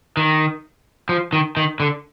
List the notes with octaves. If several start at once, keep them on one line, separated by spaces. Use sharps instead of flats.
D#3
F3
D#3
D#3
D3